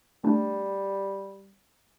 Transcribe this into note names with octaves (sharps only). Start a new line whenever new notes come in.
G3 A3 D4